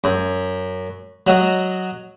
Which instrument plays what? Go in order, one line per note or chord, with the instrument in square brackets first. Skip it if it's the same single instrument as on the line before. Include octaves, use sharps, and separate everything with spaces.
[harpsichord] F#2
F#3 F#4 D#5